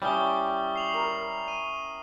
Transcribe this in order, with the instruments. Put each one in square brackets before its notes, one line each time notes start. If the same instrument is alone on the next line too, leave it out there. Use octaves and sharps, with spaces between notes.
[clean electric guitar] G3 [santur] C#4 E4 G5 [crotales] C#6 D#6 G7
[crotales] C7 F7 F#7
[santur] A#4
[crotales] D#7